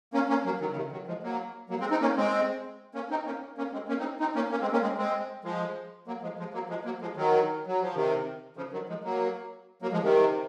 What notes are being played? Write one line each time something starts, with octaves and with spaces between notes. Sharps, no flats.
A#3 C#4
A#3 C#4
F#3 A#3
D#3 F#3
C#3
C3 D#3
D#3 F#3
F3 G#3
F#3 A#3
F#3 A#3
G#3 C4
C4 D#4
A#3 C#4
G#3 C4
A#3 C#4
C4 D#4
A#3 C#4
A#3 C#4
G#3 C4
A#3 C#4
C4 D#4
C4 D#4
A#3 C#4
A#3 C#4
G#3 C4
A#3 C#4
G#3 C4
G#3 C4
F3 G#3
F#3 A#3
F3 G#3
F3 G#3
F#3 A#3
F3 G#3
F#3 A#3
F3 G#3
D#3 F#3
F#3
F3
C3 D#3
C#3 F3
D#3 F#3
F3 G#3
F#3 A#3
F#3 A#3
F3 G#3
C3 D#3